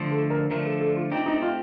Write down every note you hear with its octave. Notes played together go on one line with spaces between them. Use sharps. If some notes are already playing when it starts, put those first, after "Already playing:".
Already playing: D3 F3 A3
A4
A#4
D3 F3 A3 A#4
A4
A4
F4
A3 C4 D#4 G4
D#4
F4